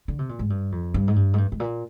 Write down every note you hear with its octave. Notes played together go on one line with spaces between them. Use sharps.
D3
C3
A#2
G#2
G2
F2
G2
G#2
G2
G#2
G2
G#2
A#2